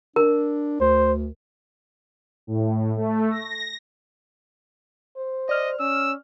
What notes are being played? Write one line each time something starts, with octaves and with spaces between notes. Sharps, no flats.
D4 A#4
D2 C5
A2
A3
A#6
C5
D5 D#5 F6
C#4 E6